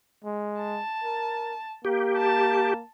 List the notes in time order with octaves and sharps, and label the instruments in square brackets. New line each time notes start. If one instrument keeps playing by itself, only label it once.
[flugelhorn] G#3
[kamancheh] A5
[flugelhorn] A#4
[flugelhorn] A#3 [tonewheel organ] G4
[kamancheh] A5